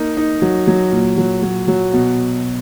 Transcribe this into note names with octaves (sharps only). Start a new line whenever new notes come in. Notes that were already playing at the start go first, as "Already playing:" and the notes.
Already playing: A#3 D#4
D#4
F#3
F#3
A#2
F#3
F#3
F#3
B2